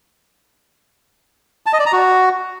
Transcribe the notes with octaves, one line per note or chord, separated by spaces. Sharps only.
A5
D#5
D5
A#5
F#4